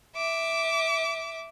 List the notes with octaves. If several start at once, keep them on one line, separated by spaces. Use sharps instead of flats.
E5 D6